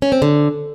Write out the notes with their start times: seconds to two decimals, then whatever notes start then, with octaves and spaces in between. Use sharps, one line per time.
0.02 C#4
0.12 C4
0.22 D3